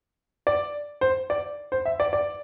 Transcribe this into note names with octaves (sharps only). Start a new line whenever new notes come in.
D5
C5
D5
C5
E5
D5
D5